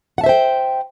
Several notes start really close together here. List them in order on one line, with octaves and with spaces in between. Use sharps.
F#5 A5 E5 C5 G5